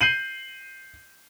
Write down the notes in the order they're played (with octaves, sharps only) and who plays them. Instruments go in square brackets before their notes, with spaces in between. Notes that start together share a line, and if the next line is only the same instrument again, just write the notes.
[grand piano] G6 C7 D#7 F#7